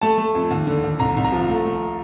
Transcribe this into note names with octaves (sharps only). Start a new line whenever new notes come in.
A3 A5
A3
F2
D#2
D3
D#2
C2 A#5
C2
A#5
F3
A3
A3